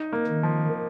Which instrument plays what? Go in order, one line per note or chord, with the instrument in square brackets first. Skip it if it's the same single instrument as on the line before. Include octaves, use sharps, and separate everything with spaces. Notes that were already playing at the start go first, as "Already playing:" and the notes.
Already playing: [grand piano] D#4
A#3
[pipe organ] D#3
[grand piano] F3